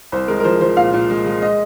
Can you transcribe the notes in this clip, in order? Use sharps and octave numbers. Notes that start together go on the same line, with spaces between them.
C2 C5
G#3 A#4
A#4
F3 C5
F3 C5
A#2 F5
A#2
G#3
G#3
D#5